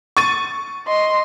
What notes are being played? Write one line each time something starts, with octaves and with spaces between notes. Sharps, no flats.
C#6 A6 D#7
D#5 C6